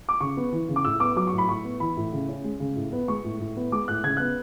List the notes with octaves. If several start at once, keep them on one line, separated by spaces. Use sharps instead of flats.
D6
C#3 C#6
B3
E3
C#3
D6
A2 E6
B3 D6
F#3 D6
A2 C#6
B5
A2 C#6
B3
E3 B5
A2
C#3
C#4
G#3
C#3
A2
B3
G#3 C#6
A2
A2
B3
G#3 D6
A2 F#6
C#3 G#6
B3 F#6